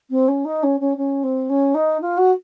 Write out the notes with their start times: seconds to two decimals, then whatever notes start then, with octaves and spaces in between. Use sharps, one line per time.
0.10 C4
0.28 C#4
0.44 D#4
0.63 C#4
0.80 C#4
0.97 C#4
1.23 C4
1.49 C#4
1.74 D#4
2.01 F4
2.17 F#4